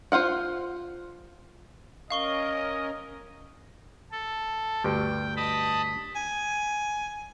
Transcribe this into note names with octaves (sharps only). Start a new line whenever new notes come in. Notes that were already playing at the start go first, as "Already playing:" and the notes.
F4 C5 F5 F#5
C#4 A#4 D#5 F5 C#6 G7
A4
D2 G2 G5
D#5 A5 B5
G#5